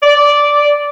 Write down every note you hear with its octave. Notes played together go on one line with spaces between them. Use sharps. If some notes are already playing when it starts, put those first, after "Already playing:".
D5